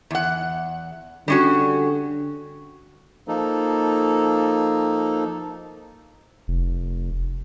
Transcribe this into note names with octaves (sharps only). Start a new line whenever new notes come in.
E2 F#5
D3 G3 C#4 F#4
F3 A#3 D#4 A4
F1